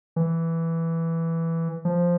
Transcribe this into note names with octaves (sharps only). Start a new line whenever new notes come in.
E3
F3